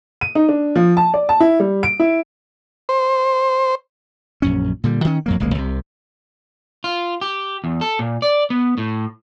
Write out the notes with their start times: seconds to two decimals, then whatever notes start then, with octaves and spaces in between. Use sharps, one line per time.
0.21 D#7
0.35 D#4
0.49 D4
0.76 F3
0.97 A5
1.14 D5
1.29 A5
1.40 E4
1.60 G3
1.83 D7
2.00 E4
2.89 C5
4.42 A#1 F#2 C#4
4.84 A#2 D3 G3
5.05 D#3 C#4
5.26 F2 F#3 A#3
5.40 D#1 B1 G#3 A#3
5.55 C2 C3
6.84 F4
7.21 G4
7.64 E2
7.81 A4
7.99 A#2
8.22 D5
8.50 B3
8.78 A2